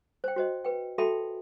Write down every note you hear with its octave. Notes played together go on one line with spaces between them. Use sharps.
C5 G5
F#4 C5 D#5
B4 G5
F#4 A4 E5 G5 A5 B5